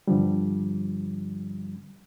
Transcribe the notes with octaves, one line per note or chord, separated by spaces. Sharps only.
G2 D3 F3 G3